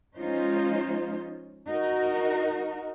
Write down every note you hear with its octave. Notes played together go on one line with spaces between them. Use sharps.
F3 G#3 C#4 D#4 F4 C5
D#4 F#4 A#4